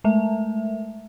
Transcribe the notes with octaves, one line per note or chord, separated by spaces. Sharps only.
G#3 A3 E5